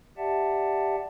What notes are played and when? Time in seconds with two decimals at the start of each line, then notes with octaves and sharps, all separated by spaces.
0.17 G4 D5 E5 F#5 A5